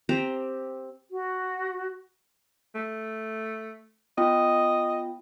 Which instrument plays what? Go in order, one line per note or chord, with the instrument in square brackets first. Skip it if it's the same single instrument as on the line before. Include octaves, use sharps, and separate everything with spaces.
[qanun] C4 G4 C5 A#5
[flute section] F#4
[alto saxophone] A3
[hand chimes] B3 F4 G5 [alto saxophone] D#5